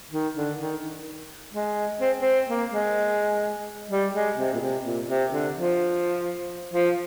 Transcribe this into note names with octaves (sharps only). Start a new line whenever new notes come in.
D#3
D3
D#3
G#3
C4
C4
A#3
G#3
G3
G#3
C3
A#2
C3
A#2
C3
D3
F3
F3